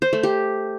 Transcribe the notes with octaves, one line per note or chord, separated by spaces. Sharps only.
C5
A3
G4